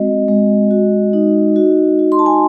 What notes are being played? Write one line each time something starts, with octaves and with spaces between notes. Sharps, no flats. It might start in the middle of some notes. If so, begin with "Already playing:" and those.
Already playing: G#3 C4 F#4 D#5
G#3
F#4
D#4
F#4
F#4
C6
A5
G#5